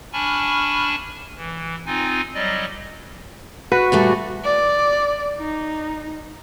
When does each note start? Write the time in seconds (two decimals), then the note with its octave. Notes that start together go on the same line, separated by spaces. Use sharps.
0.13 D4 G#5 A5 B5 C#6 F6
1.37 E3
1.86 C4 D#4 F4 G#5
2.34 F#3 G3 D5 D#5
3.72 F#4 B4
3.92 A#2 G3 A3
4.44 D5
5.38 D#4